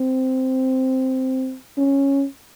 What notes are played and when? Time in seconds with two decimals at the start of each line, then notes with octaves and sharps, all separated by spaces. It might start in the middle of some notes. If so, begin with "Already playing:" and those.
Already playing: C4
1.77 C#4